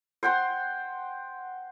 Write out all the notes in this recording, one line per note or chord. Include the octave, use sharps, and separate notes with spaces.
C5 F#5 G5 C6